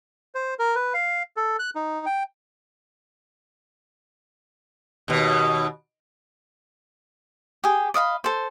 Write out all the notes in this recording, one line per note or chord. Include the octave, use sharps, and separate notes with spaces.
C5
A#4
B4
F5
A4
F#6
D#4
G5
D#2 B2
G4 G#4
D5 D#5 F5 B5
A4 C5